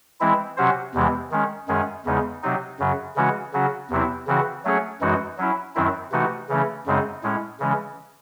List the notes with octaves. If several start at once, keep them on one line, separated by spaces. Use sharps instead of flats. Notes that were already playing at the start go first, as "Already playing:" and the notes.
E3 G#3 C4 E4
C3 F#3 C#4 F#4 C5
E2 C3 E3 G#3
D#3 G#3 C#4
F#2 D#3 G#3 C#4 G#4
E2 C#3 G#3 D#4
C3 F#3 C4 D#4
F#2 C#3 F#3
C#3 E3 G#3 C#4 F#4
C#3 F#3 C#4 F#4
E2 C3 F#3 C4 E4
C#3 E3 C4 F#4
F#3 A3 C#4 G#4 C#5
F#2 E3 G#3 D#4 F#4
F#3 C#4 E4
F#2 D#3 F#3 C4 E4
C3 E3 A3 D#4 F#4
C#3 E3 A3 C#4
F#2 C#3 G#3 C4 D#4
A2 G#3 C#4
C#3 E3 G#3 C#4